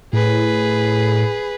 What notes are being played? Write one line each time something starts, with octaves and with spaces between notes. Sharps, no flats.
A2 G#4 B4